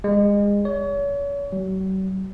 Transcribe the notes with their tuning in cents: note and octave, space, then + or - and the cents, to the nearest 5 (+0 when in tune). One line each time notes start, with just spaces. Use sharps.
G#3 -30
C#5 +35
F#3 +45